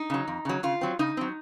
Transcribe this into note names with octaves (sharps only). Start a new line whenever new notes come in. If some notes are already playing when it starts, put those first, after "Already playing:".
Already playing: D#4
C#3 F#3
F2
C#3 F#3
C#3 F4
F#3 C4
C#3 D#4
F#3 C4